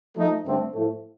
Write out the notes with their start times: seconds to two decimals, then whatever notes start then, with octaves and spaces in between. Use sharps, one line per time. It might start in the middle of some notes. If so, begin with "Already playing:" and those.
0.16 F3 A3 D#4
0.44 G2 D3 A3 C4
0.74 A2 F3 A3